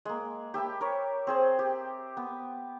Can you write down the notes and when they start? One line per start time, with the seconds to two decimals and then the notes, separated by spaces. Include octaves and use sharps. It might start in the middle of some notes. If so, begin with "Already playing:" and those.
0.05 G#3 A#3
0.54 G4 E5 A5 B5
0.81 A#4 C#5
1.27 C4 G#4 C5
1.59 G4
2.17 B3